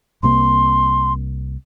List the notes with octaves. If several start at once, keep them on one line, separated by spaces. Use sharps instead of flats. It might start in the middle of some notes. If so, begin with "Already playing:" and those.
C2 C3 A#3 C6